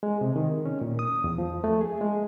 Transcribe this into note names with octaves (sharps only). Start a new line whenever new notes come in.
G#3
C3
D#3
C#4
A#2
D#6
E2
F3
A3
G#4
G#3